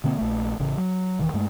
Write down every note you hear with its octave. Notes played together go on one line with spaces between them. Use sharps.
B2 D3 A#3 C4
A#1 A3
A1 C#3
F#3
E1 D#3 E3
G2 G#3 A3